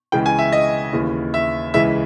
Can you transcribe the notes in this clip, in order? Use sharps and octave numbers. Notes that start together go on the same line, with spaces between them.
C#2 C#3 E3 G5
G#5
E5
D#5
D#2 C#3 E3
E5
C#2 C#3 E3 E5